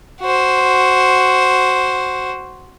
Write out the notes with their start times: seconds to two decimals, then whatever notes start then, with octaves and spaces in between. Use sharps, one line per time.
0.21 F#4 C5